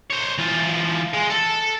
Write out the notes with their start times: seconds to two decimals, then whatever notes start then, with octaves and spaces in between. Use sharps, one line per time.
0.10 C5 C#5
0.38 E3 F4
1.13 G#3
1.30 A4